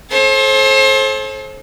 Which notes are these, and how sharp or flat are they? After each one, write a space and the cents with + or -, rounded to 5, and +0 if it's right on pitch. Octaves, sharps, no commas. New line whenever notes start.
A4 -35 C5 +35